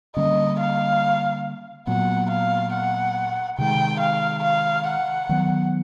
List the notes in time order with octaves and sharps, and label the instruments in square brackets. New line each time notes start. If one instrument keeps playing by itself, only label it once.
[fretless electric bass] D3 G3 A#3 C#4 [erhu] D#5
[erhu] F5
[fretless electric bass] A#2 F#3 B3 [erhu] F#5
[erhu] F5
F#5
[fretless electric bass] C3 D#3 G#3 [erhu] G5
[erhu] F5
F5
F#5
[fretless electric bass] D#3 F#3 B3